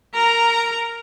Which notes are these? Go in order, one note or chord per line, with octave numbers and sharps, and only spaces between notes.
A#4 A#5